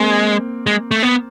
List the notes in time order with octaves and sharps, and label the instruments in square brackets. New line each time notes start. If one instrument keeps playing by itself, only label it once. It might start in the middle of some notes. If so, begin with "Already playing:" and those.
Already playing: [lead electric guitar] G#3 [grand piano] A#3 C4
[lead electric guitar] G#3
A3
B3